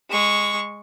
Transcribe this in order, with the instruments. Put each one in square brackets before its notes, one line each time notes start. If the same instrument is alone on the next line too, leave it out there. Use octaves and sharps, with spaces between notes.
[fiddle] G#3 C#6